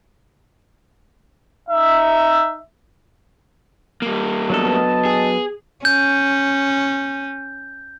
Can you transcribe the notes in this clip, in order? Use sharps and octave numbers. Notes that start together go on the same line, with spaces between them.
D#4 E5
G3 A#3
F#3 B3 D4 A4 D#5 A5
G#4
C#4 G6